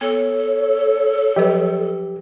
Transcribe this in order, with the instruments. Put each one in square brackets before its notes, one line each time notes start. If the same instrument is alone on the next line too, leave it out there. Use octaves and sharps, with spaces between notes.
[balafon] B3 [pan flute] A4 [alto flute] C#5
[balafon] F3 F#3 B4 [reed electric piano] G4